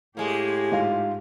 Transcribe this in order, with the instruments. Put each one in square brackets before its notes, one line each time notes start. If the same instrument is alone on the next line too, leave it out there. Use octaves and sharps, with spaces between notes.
[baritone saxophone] A2 [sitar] G#3 A#3 [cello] G4
[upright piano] G#2 F4 F5